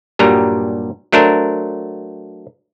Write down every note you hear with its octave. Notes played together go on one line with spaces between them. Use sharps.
G2 A#2 F#3 G3 A#5
F#3 A3 D4 A#4 C5